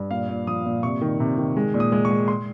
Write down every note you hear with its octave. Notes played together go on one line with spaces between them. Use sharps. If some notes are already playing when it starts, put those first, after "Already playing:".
Already playing: G2
A#2 F5
A#2
F3 D#6
A#2
C3 C#6
D#3
C3
D#3
G#3
A#2
D#6
G#3
C#6
G#3
C6